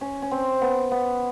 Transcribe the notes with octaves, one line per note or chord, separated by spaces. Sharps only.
C#4
C#4
C4
B3
B3